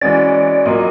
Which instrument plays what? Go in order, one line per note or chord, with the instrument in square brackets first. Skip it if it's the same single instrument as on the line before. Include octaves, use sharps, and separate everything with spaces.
[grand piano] E3 G#3 C#4 F#4 [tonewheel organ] D5
[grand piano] A#2 F#3 A#3 [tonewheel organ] D#5